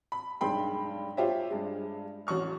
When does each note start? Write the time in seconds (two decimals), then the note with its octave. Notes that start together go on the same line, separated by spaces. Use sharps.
0.12 B5
0.41 B1 G2 G#3 G5 B5 C6
1.17 F4 G4 C5 C#5 E5
1.50 G2 G#3
2.27 A1 F#4 C#6 F6